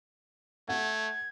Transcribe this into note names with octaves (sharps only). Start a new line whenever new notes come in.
A3 F#5 G#6